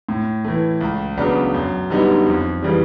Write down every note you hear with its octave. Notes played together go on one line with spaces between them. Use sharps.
A2
E3 A3
C#2
C#3 F#3 B3 D4
F#2
D3 G3 B3 D#4
F2
C#3 E3 G3